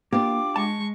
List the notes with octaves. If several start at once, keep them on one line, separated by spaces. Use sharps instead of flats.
A#3 D4 F4 G4 D6
G#3 A5 C#6